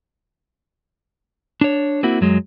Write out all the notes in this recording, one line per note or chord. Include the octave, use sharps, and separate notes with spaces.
D4 C#5
A#3 C4 E4 F#4
F#2 F#3 G#3